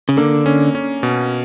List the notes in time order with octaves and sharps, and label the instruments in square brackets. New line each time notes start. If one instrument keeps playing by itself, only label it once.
[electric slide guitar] C#3
[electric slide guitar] D3 [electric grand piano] A#3
[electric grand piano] C#4
C#4
B2